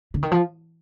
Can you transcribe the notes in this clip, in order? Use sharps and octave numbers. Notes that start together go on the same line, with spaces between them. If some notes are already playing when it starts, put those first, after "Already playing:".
D3
D#3
F3